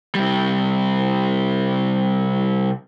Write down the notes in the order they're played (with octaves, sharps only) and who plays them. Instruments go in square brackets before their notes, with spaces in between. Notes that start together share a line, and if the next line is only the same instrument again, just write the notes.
[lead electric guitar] C3 G3